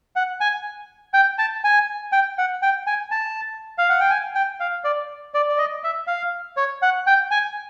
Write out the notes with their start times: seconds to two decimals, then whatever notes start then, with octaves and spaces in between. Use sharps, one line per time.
0.16 F#5
0.41 G#5
1.14 G5
1.38 A5
1.64 G#5
2.12 G5
2.38 F#5
2.62 G5
2.87 G#5
3.11 A5
3.78 F5
3.89 F#5
4.00 G5
4.10 G#5
4.35 G5
4.60 F5
4.84 D5
5.34 D5
5.49 D5
5.58 D#5
5.84 E5
6.07 F5
6.57 C#5
6.82 F#5
7.07 G5
7.31 G#5